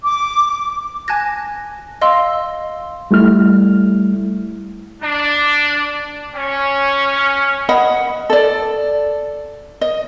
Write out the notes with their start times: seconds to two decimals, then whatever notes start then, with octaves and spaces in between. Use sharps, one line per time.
0.03 D6
1.08 G#5 A5 F#6 G#6 A#6
2.01 D#5 F5 C6 E6
3.11 G3 A3 E4 F6
5.03 D4
6.34 C#4
7.69 D#5 F#5 B5
8.30 A4 D5
9.81 D#5